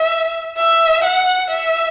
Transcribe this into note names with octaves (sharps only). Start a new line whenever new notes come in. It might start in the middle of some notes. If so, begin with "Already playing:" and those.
Already playing: E5
E5
F#5
E5